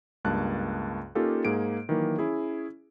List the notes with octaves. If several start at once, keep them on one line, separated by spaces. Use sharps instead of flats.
C#2 G2 A#3 A5 F#6
A#3 C#4 D#4 F4 G4 A4
G#2 A#3 G#4 D7
D#3 E3 F#3 A#3
C#4 E4 G#4